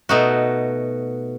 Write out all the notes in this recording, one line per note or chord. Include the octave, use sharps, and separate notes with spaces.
B2 A3 D#4 F#4